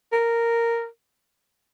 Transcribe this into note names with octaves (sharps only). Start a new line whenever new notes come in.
A#4